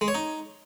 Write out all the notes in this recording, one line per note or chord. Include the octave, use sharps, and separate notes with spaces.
G#3
C#5
D#4